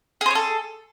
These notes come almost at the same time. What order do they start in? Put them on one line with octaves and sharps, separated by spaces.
G#4 C5 C#5 A4